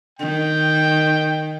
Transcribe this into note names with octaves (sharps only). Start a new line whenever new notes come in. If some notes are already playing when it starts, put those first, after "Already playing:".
D#3 G5